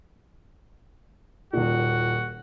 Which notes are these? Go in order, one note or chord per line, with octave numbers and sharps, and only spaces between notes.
D#1 A#2 F#4